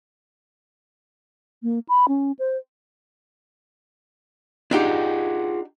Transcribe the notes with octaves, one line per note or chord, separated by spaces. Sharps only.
A#3
B5
C#4
C5
D4 D#4 F4 G4 G#4 F#5